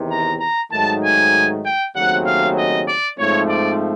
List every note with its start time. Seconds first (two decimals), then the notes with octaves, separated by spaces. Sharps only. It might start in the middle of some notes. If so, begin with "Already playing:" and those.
Already playing: E2 C3 D#3
0.09 A#5
0.40 A#5
0.71 G#2 D#3 F#3 A3 A5
1.01 G#5
1.63 G5
1.93 D#2 C#3 F#3 A3 C4 F#5
2.25 F5
2.56 D#5
2.87 D5
3.18 G#2 F3 A3 C4 C#5
3.49 D5